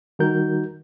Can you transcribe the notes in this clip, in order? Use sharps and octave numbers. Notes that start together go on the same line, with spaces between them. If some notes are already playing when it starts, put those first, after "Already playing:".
D#3 G3 D#4 F#4 A#4 G6